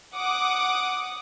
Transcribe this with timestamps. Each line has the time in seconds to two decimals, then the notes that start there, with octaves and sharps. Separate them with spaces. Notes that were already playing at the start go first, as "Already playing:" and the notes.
0.16 F#5 D6 D#6